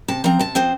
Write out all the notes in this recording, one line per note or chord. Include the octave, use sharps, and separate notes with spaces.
C3 A5
F3 C4 A#5
C3 A5
F3 C4 C5